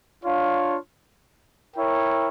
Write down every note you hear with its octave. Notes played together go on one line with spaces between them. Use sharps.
D4 F4 C#5 F5
E4 A#4 C#5 G5